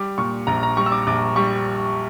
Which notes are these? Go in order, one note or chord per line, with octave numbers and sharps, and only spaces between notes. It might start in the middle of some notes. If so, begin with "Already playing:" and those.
Already playing: G3 D6
A#2 C#6
A#1 A#5
A#5
G3 C#6
E6
D6
A#1 D6
G3 C#6